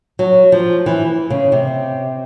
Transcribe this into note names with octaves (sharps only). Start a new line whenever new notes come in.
F#3
F3
E3
C#3
C3